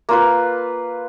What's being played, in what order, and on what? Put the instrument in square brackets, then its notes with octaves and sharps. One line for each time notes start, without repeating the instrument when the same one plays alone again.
[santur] A#3 F4 B4